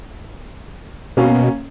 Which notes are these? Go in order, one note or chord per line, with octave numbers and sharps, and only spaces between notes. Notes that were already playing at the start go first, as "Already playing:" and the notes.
B2 A#3 C#4 F5